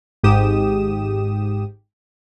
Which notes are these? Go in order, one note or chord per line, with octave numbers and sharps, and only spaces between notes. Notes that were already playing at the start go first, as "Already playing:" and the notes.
G#1 G#2 G4 D#6 E7